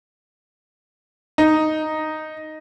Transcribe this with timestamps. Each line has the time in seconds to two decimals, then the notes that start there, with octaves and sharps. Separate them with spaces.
1.38 D#4